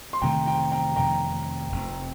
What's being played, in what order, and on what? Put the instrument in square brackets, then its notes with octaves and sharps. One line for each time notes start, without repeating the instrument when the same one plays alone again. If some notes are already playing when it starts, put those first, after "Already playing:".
[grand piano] C6
[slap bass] F2 C3 D#3 A3 [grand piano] G5 A#5
[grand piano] G5 A#5
G5 A#5
[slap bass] F2 C3 D#3 A3 [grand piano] G5 A#5
[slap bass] F1 F2 C3